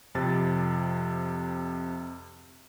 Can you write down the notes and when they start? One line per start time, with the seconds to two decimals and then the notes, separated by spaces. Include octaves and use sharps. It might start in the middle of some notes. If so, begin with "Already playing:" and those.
0.15 F2 C3 A6